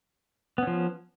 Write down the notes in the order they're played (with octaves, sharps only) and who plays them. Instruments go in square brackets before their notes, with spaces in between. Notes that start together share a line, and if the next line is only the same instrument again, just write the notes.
[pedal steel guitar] B3
C#4
F3